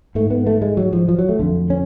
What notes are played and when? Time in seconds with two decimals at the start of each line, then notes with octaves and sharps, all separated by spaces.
0.15 G#2 A3
0.30 B3
0.47 A3
0.62 G#3
0.77 F#3
0.93 F3
1.08 F3
1.18 F#3
1.29 A3
1.39 F2 D3
1.70 C#4